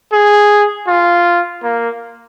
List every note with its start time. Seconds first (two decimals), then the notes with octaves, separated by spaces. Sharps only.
0.12 G#4
0.88 F4
1.63 A#3